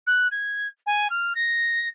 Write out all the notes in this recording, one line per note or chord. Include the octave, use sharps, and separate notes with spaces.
F#6
G#6
G#5
F6
A#6